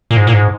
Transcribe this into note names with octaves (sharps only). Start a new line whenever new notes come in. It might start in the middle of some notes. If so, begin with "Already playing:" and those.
A#2
G#2
A#2
G#2